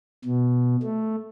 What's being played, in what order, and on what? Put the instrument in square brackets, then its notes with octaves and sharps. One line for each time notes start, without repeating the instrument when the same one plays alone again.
[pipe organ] B2
A3